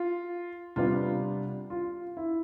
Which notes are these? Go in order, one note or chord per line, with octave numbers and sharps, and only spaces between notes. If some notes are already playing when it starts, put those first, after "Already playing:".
Already playing: F4
C3 G3 B3 D4 F4
F4
E4